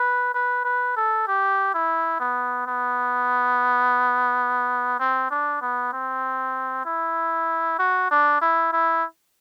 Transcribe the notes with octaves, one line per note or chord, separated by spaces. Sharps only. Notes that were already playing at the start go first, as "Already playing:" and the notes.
Already playing: B4
B4
B4
A4
G4
E4
B3
B3
C4
D4
B3
C4
E4
F#4
D4
E4
E4